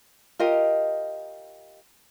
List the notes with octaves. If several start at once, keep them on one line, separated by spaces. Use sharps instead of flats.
F4 G4 A#4 D#5